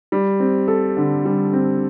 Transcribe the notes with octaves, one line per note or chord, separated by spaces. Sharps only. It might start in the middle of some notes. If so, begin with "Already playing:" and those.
G3
C4
A4
D3
G3
C4